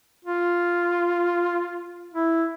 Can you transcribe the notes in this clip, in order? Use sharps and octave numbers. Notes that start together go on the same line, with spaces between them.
F4
E4